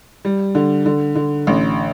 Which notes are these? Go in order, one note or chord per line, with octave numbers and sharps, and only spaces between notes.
G3
D3
D3
D3
A1